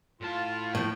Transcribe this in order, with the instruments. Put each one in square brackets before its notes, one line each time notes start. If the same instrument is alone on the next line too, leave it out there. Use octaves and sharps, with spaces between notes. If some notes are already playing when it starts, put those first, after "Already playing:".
[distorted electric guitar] A2 A5 [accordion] F4
[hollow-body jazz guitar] A2 F3